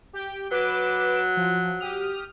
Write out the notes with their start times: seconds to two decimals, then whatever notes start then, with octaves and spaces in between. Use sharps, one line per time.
0.13 G4 G5
0.51 F#3 B4 D6 E7
1.37 F3
1.80 G4 D#6 F6